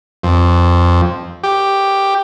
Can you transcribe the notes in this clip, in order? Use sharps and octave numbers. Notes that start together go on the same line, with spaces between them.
F2
G4